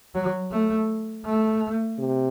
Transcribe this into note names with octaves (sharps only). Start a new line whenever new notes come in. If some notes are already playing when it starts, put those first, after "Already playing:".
F#3
A3
A3
C3